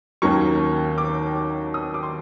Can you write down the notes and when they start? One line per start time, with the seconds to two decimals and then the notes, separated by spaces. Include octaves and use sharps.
0.22 D#2 D#3 F#3 A#3 C#4 C#6
0.98 D6
1.74 D#6
1.94 D6
2.03 C6